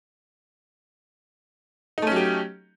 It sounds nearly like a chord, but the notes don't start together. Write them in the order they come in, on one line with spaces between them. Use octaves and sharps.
D#4 A3 C#4 F#3 G4